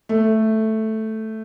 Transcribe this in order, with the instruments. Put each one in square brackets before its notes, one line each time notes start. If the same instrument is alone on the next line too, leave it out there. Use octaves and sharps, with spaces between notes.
[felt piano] A3